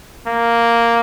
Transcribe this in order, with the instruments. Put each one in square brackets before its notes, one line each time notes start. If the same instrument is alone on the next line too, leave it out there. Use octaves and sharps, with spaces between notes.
[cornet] A#3